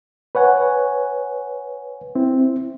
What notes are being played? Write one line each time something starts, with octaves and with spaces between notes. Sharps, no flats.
B4 C#5 F#5 G#5
C4 E4